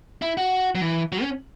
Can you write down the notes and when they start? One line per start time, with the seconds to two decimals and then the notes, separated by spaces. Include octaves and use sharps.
0.22 E4
0.37 F#4
0.75 F#3
0.81 E3
1.12 F#3
1.22 C#4